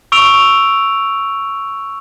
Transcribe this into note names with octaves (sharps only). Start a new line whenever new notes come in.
C#6 E6 D7 F7